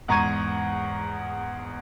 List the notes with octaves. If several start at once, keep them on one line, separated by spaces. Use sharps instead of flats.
E2 G#2 A#5 C#6 G#6 D#7